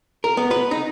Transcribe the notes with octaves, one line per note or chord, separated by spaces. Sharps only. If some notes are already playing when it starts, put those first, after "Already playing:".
A#4
B3
B4
D#4